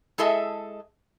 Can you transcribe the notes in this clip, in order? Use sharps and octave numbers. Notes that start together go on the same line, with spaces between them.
G#3 E4 G#4 A4 D#5 E5